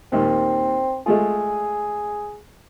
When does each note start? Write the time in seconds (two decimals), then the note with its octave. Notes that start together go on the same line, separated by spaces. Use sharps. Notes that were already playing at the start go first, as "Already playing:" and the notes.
0.12 D#2 A#2 C4
1.06 G#3 A3 F4 G#4